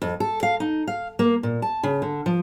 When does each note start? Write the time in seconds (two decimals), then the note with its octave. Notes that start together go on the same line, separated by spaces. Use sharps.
0.02 F2
0.20 A4
0.43 F5
0.60 D#4
0.88 F5
1.19 A#3
1.43 A#2
1.62 A5
1.83 C#3
2.02 D3
2.26 F3